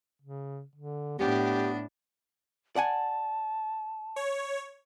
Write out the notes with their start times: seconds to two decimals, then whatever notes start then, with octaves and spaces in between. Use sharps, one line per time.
0.22 C#3
0.75 D3
1.19 A2 B3 D4 G4
2.76 D5 F#5 G#5 A5
4.16 C#5